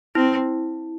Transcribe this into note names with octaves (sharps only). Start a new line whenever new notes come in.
C4 E4